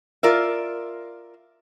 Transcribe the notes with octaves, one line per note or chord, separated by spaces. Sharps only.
F4 A#4 D5 E5